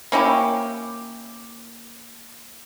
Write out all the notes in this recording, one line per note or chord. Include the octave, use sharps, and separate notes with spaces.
A#3 C#4 E4 G4